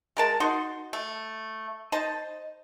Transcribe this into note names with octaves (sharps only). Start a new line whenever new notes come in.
G#3 A#4 A5
D#4 F#4 C6
A3
D#4 C5 D#5 A5